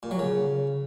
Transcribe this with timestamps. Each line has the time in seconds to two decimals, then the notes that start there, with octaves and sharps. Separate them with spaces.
0.03 A#2
0.11 F#3
0.19 C#3